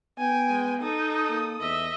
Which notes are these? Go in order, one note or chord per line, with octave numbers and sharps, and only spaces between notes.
B3 G5 G#5
G#3
D#4 A4 D#6
A#3
E2 D#5 E5